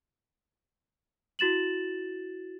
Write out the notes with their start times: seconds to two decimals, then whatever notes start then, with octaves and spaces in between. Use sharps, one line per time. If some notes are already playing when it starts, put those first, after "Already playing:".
1.39 E4 F#4 A6 E7 F#7